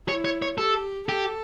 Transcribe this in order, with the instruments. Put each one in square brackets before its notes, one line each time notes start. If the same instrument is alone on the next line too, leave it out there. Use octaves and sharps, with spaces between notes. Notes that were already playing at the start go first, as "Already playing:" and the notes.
[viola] E4 [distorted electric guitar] C#5
[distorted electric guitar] C#5
C#5
[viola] G4 [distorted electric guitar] A4
[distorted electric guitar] G4 [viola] A4